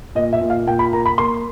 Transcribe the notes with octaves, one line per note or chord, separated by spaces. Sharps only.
A#2 D#5
E5
A#2
F5
A#2 G5
B5
A#3 A#5
B5
A#3 C6